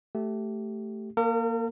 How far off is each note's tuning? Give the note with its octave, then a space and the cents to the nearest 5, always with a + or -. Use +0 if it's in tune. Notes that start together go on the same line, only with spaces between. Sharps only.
A3 +0 G4 -15
A#3 +0 A#4 -45